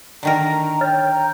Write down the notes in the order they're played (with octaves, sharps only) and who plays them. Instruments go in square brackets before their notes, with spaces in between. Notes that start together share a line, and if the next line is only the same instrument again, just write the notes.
[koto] D3 D#3 A#4 [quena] A#5
[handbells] C#5 F6 A6 [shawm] G5
[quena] A#5